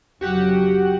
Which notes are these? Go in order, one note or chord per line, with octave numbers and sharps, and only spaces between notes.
F1 C#3 F#3 F#4 G4 F#5